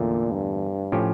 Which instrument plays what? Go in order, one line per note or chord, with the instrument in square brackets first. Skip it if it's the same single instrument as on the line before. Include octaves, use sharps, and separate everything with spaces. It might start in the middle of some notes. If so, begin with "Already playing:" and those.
Already playing: [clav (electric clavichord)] E2 D3 A3 [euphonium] A#2
[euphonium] G2
[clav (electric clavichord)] A2 F3 C#4 G4